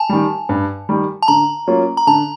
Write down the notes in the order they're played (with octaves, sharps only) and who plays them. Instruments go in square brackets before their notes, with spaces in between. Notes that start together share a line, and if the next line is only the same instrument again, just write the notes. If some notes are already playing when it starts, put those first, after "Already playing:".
Already playing: [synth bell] G#5 A5
[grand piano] D#3 G3
G2
D#3 G3
[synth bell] A5
[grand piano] D3 [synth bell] A#5
[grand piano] F#3 A#3 C#4 F4
[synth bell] A#5
[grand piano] D3 [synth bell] A5